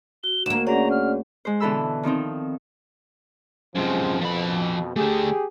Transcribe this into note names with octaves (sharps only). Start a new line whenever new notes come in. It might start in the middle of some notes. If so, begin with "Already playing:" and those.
F#4 G7
D2 A#3 E7
C#4 F#4 G#4 C#5 D5 F#5 A#5
F6
G#3 C5
B2 D3 E3 A4 B5 E6
D#3 F3 C4 D#4
F#2 C3 F3 G#3
F2 B2 F3 B5
D3 A3 G4 G#4